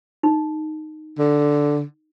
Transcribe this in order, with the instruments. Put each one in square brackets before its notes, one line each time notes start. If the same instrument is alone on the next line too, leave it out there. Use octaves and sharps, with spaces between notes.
[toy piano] D#4
[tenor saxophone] D3